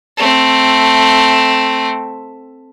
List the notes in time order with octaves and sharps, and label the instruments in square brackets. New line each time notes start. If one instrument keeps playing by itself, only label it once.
[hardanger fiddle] A3 C4